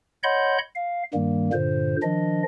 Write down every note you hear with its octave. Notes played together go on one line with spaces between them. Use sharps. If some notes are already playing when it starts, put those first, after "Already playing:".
C#5 D#5 F#5 B5 C6 G6
F5
G2 D#3 G3 A#3
G2 A#2 D3 C5
D#3 F3 D4 D#5